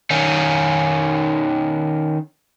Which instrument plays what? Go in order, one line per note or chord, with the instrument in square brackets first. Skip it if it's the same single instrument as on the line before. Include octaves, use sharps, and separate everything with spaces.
[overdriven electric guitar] D#3 C#4